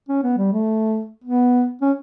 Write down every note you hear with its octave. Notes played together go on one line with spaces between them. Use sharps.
C#4
B3
G3
A3
B3
C#4